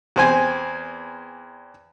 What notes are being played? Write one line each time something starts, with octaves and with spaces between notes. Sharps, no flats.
E2 C4 G#5